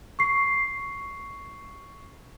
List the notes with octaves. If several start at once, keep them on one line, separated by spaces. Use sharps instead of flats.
C#6 C7